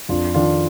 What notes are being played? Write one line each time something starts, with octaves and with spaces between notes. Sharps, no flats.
F2 D4 F4
D#3 D4 F4